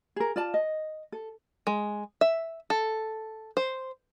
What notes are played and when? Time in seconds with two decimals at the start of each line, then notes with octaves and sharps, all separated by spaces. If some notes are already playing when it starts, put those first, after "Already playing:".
0.16 G#4 A#4
0.36 F4 D5 A5
0.54 D#5
1.12 A4
1.67 G#3
2.21 E5
2.70 A4
3.57 C5